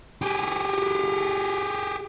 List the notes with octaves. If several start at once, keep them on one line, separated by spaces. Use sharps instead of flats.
G4 G#4